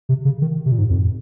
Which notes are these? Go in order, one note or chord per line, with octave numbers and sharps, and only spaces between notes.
C3
C#3
D#3
C3
A#2
G#2
F2